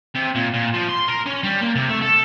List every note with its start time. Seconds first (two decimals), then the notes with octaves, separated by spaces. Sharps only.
0.15 C3
0.35 A#2
0.54 A#2
0.74 F3
0.89 C6
1.08 A#4
1.26 C#4
1.43 G3
1.61 A#3
1.75 C3
1.89 A3
2.02 A4